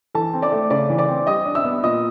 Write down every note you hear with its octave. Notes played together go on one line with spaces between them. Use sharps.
E3 A4 A5
C4
D5 D6
A3
C#3 D5 D6
E3
D5 D6
C4
G3 D#5 D#6
D4
E5 E6
B3
A#2 D#5 D#6